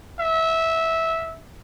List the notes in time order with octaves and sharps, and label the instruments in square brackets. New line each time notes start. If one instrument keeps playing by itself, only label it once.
[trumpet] E5